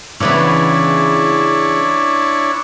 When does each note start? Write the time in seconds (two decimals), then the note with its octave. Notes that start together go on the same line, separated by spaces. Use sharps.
0.20 C#3 E3 B3 D4 E4 C#5